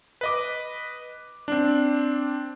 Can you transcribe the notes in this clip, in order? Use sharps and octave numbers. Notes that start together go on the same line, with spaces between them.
B4 D#5 D6
C4 D4